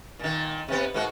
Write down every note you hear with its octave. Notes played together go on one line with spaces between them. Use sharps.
A#2 D#3
C3 B3
G#2 A#3 F#4